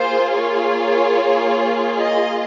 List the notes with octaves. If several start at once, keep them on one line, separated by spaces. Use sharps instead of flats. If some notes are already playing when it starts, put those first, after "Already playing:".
Already playing: A#3 F4 G#4 C5
C#5
D#5